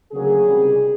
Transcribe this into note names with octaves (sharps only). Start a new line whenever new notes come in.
D2 C#3 F#3 A#3 G#4
C#2 C3 D#3 G3